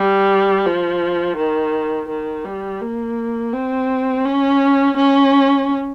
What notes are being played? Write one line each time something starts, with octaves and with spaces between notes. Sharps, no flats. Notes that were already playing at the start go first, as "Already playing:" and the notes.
Already playing: G3
F3
D#3
D#3
G3
A#3
C4
C#4
C#4